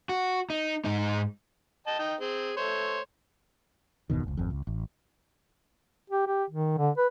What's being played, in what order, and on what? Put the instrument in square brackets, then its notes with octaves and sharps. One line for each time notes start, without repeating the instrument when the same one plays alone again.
[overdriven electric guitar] F#4
D#4
G#2 D#4
[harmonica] D#5 G5 A5
D#4 G5
C4 G#4
A3 C5 C#5
[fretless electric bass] G1 E2 B2 D#3
F1 C#2
G#1 F2
C#2
A1
[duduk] G4
G4
D#3
D3
B4